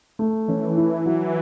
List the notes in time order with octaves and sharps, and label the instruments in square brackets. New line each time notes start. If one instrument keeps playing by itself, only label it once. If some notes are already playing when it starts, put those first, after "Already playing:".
[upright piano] A3
[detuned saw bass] E3 [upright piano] C#4
[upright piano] E4
F#3